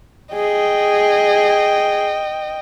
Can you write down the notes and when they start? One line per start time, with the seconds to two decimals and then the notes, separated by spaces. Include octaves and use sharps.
0.35 G#4 D#5 G5